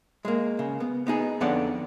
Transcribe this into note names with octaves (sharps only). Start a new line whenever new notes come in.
G#3 A#3
C#3
B3
B3 D#4 G#4
F2 D3 B3 C#5 D5 F#5